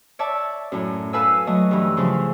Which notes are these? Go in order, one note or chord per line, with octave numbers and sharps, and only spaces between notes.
C#5 D5 E5 A5
F#2 A2
A4 B4 F5 G#5 E6
F#3 A3 D#5
G2 E3
C#3 F3 E4